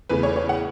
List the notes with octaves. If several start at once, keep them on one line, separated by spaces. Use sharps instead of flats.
E2 C#3 A3 B4
C#5
C#5
F#5